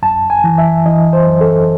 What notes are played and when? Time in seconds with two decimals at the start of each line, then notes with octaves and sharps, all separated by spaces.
0.03 F#2 A5
0.30 G#5
0.44 E3
0.58 E5
0.86 E3 D#5
1.13 C5
1.26 F#2
1.41 A4